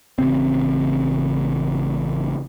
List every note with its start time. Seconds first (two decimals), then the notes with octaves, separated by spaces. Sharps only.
0.19 A1 C#3 C4